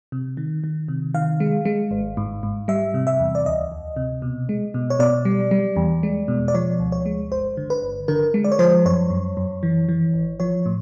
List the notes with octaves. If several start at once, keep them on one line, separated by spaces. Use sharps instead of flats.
C3
D#3
D#3
C3
D#3 F5
G#3
G#3
G#1
G#2
G#2
G3 E5
C3
E5
E2
D5
D2 D#5
D2
C3
B2
G#3
B2
C#5
B2 D5
G3
G3
E2
G#3
B2
D5
F3 C#5
D2
C#5
G#3
G1 C5
D3
B4
G1
D3 A#4
G#3
D5
C#5
F3 C5
F#2 C#5
F#2
F#2
E3
E3
G#1
F3 C#5
A2